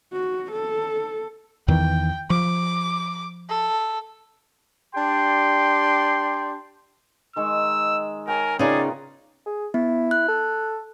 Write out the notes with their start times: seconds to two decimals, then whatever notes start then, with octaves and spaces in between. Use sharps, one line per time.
0.13 F#4
0.52 A4
1.68 E2 D#3 E3 G5
2.30 F3 D6
3.49 A4
4.95 D4 G4 D5 G5 C6
7.36 D#3 G#3 C#6 E6
8.28 A#4 C#5 G5 G#5
8.59 C#3 B3 D#4 F4 G#4 A#4 D5
9.46 G#4
9.74 B3 E4
10.11 F#6
10.28 A4